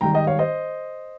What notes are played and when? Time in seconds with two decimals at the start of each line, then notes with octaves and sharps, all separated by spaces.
0.01 G#1 G#2 D#3 G3 G5 A#5
0.13 D#5 G5
0.27 C#5 F5
0.39 C5 D#5